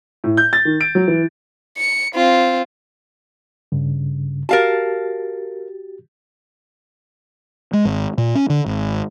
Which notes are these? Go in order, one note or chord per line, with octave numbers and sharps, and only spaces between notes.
A2
G6
A6
D#3
D7
F#3
E3
C#7
C4 F4
G2 C#3
F#4 G4 A#4 F5 A5 A6
G#3
G#1
A#2
C#4
D3
G#1